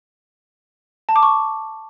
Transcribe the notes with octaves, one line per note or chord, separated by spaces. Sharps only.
A5
D6
C#6